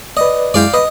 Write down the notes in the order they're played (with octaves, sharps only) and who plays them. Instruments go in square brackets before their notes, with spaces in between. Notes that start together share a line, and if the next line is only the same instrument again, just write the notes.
[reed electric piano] B4 D5 [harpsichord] D#5
[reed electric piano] F#2 G#3 E4 [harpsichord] D5 F5 G5
[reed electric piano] B4 [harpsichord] D#5